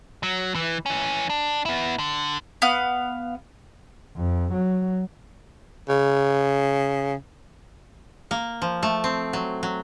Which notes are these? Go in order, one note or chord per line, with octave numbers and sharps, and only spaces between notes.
F#3
E3
E3 C#4
D4
B3 E4
D3
B3 F5
F2
F#3
C#3
A#3
F3
A3
C4
F#3
F#3